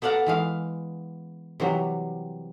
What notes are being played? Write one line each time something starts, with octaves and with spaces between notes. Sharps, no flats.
B3 A4 D5 F5 F#5 A#5
E3 G#3 F5
C3 E3 F#3 G3